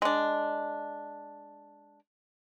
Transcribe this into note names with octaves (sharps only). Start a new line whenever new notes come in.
G#3 D4